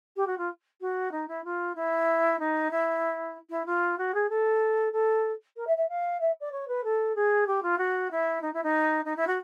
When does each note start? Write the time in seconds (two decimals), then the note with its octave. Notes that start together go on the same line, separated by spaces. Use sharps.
0.16 G4
0.27 F#4
0.38 F4
0.81 F#4
1.11 D#4
1.28 E4
1.44 F4
1.75 E4
2.39 D#4
2.71 E4
3.50 E4
3.66 F4
3.98 F#4
4.14 G#4
4.29 A4
4.93 A4
5.57 A#4
5.67 E5
5.77 E5
5.89 F5
6.20 E5
6.40 D5
6.52 C#5
6.68 B4
6.84 A4
7.15 G#4
7.47 G4
7.63 F4
7.78 F#4
8.11 E4
8.42 D#4
8.53 E4
8.63 D#4
9.05 D#4
9.16 E4
9.27 F#4